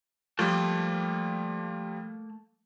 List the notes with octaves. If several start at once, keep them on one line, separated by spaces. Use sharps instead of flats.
F3 G3 A3 A#3